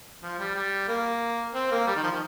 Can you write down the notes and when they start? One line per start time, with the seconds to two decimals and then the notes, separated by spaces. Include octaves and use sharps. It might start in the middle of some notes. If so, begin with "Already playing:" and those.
0.23 F3
0.39 G3
0.55 G3
0.88 A#3
1.54 C4
1.71 A#3
1.87 G3
1.96 D#3
2.03 F3
2.11 D#3